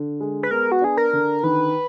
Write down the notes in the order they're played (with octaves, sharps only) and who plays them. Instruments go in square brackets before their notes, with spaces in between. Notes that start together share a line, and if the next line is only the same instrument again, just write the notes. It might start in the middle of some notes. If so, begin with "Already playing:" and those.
Already playing: [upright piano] D3
G#3
[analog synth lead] B4
[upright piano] B3 [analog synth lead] A#4
[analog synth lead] F#4
[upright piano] D4 [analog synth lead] G#4
[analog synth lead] A#4
[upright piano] D3
[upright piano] D#3 [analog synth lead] B4